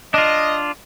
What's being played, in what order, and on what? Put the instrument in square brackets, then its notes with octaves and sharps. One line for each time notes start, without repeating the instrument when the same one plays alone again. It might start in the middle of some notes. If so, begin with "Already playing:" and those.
[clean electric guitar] D4 F4 [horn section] D#5